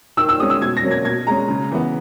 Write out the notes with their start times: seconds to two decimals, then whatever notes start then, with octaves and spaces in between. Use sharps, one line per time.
0.17 D#3 E6
0.29 E6
0.40 G#3 C#4 D#6
0.50 E6
0.61 B2 G#6
0.77 A#6
0.83 F#3 A#3 C#4
0.91 G#6
1.05 B2 G#6
1.27 G#3 C#4 A#5
1.48 C#3
1.72 E3 B3